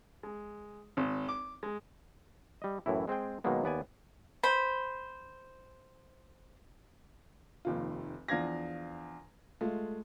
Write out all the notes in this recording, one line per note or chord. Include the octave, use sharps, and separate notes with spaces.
G#3
G#1
D6
G#3
G3 D#5
F#2 A2 E3 E4
G#3 C4 G#4 G5
B2 D#3 F#3 G#3 A#3 B3
D#2 B3 D5 G#5
C5 B5
F1 D#2 F4
E2 F3 D4 F5 G#6 A#6
G#3 A3 F4